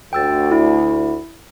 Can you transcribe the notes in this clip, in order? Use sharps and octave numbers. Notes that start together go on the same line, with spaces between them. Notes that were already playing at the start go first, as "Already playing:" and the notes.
D2 G5 E6 A6
E4